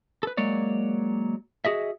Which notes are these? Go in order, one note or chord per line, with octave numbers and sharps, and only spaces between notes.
A4 B4
F#3 G#3 A#3 C#5 D5
F#4 G#4 D#5 E5